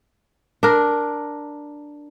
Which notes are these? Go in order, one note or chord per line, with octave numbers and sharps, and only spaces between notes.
D4 A#4